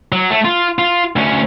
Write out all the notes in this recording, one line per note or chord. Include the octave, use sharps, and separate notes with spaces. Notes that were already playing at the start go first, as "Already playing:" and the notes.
F#3
A3
F4
F4
D2 C#4